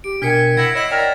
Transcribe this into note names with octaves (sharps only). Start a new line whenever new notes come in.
G4 D7
B2 D4 A#4 G5 G#5 F6 B6 C#7
E4 F#5 G#6 A#6 C#7
E4 C#5 D#5 A#6 C7 E7
A#4 D5 G5 A6 B6